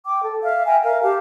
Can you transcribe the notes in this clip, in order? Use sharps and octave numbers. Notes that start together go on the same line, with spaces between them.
G5 D6
A4
E5 F5
E5 G5 G#5 A#5
A#4 F5
G4 F5 A5